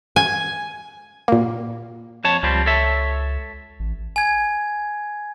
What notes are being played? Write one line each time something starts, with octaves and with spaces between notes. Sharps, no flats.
G#5
A#2 A#3
F2 C#5 A5
C#2 F3 G3 C4
A4 C#5 E5
A1
G#5 G#6